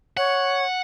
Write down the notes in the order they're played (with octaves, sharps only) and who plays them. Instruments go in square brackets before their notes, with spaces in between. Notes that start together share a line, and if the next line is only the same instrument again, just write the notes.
[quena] C#5 [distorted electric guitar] F#5